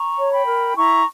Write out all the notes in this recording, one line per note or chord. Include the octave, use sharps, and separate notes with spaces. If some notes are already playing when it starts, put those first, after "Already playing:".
Already playing: A#5 C#6
C#5
G5 B5
A#4
E4 A#5 C#6